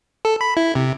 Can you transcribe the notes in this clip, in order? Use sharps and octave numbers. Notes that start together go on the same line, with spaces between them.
A4
B5
E4
C3